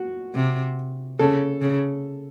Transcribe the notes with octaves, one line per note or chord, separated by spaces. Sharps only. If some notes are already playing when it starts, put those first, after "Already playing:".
Already playing: F#4
C3
C#3 A4
C#3